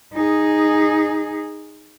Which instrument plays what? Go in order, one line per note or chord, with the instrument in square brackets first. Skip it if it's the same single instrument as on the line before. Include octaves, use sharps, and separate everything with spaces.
[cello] D#4 G#4